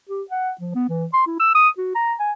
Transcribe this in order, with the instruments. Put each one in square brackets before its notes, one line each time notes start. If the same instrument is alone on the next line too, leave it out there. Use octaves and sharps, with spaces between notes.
[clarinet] G4
F#5
F3
B3
E3
C6
E4
E6
D#6
F#4
A#5
G#5